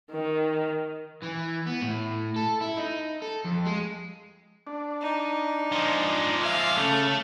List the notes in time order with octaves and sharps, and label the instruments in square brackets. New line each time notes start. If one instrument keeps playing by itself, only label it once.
[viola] D#3
[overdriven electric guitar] E3
B3
A2
A4
E4
D#4
A4
F2
G#3
[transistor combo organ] D4
[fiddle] D#4
[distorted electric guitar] F3 G#3
[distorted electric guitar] F3 G#3 [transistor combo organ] E5 D6 [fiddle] F5
[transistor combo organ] C#3 A4 [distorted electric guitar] A3